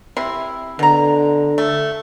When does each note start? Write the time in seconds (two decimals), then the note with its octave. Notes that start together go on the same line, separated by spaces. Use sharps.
0.17 C3 E4 C6
0.79 B2 D3 A#5
1.58 A3